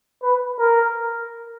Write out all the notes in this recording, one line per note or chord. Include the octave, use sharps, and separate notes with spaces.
B4
A#4